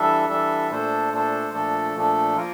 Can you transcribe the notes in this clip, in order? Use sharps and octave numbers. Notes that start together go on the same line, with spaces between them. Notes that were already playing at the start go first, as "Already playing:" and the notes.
Already playing: E3 G3 D4 A4 E5
E3 G3 D4 A4 E5
A#2 A3 D4 A4 C5
A#2 A3 D4 A4 C5
A#2 F3 A3 D4 A4
A#2 F3 A3 D4 A4
F3 A#3 F4 A#4